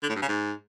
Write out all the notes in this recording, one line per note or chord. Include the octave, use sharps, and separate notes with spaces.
D3
A2
G2
C#3
G#2